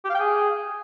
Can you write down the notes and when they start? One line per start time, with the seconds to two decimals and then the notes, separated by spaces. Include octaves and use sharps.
0.05 G4
0.10 F5
0.15 G5
0.20 G#4